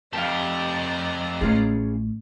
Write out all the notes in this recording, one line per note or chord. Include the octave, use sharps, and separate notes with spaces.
F2 G4 D5 D#5 F5 A5 A#5
A1 A3 C#4 F4 G#4